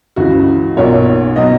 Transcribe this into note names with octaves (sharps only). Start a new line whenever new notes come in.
C#2 C#3 E3 F#4
B1 A#2 F#3 C#5
B2 F#3 D#5